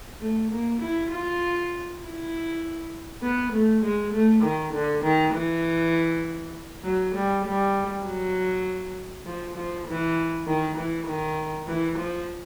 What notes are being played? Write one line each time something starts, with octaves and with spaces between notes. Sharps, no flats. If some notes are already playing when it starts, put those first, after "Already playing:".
A3
A#3
E4
F4
E4
B3
A3
G#3
A3
D#3
D3
D#3
E3
F#3
G3
G3
F#3
F3
F3
E3
D#3
E3
D#3
E3
F3